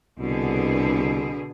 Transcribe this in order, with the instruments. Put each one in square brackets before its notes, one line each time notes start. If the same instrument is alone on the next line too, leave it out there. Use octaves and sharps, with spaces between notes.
[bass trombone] C2 [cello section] B2 D3 G#4